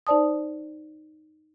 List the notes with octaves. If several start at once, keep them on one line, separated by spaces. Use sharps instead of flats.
D#4 C5 D5 A5 D#6